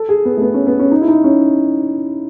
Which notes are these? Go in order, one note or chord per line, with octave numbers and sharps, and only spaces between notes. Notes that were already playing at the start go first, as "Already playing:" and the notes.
Already playing: A4
G#4
B3
A3
B3
C#4
B3
C#4
D#4
E4
D#4
C#4